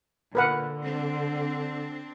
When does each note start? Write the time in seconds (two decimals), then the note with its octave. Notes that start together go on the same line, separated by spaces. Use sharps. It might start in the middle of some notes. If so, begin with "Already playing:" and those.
0.35 A#2 D3 A#4 B4 F#5
0.80 C4 D4